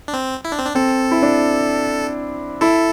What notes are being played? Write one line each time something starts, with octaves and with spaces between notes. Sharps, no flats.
D4
C4
E4
D4
C4
D4
C4 A4
E4
D4
E4 A4